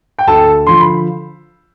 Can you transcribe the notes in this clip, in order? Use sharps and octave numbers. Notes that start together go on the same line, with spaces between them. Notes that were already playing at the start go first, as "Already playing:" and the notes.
G5
D2 A4 A5
D3 F3 C6
B5